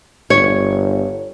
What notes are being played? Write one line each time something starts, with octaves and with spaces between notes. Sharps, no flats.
G1 C#5